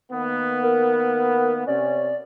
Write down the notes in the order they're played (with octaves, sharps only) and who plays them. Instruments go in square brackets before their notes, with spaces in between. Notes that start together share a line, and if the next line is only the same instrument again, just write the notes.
[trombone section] D#3 A#3 B3
[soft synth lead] A#4
[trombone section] C3 C#4 [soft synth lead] D5